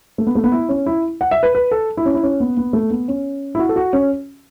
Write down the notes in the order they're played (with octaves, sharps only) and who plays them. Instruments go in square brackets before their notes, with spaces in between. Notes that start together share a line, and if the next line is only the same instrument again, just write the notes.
[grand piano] A3
B3
A3
B3
E4
C#4
E4
F#5
E5
B4
B4
A4
E4
C#4
E4
C#4
B3
B3
A3
B3
C#4
E4
F#4
A4
F#4
C#4